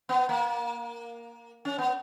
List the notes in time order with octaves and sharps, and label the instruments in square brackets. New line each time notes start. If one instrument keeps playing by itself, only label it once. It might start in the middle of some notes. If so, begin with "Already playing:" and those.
[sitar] B3
A#3
C#4
B3